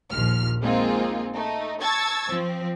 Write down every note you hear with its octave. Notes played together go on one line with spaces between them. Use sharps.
A#1 D#2 F3 F6
G#3 A#3 C4 D#4 F4 G#4
A3 D#4
A5 C#6 E6 G#6 A6
F3 C4